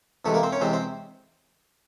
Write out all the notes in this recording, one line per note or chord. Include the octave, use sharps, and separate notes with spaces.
E2 C3 E3 G#3 A3 A4
A#3 A#4
C4 C5
C#4 C#5
E2 C3 E3 G#3 C4 C5
C4 C5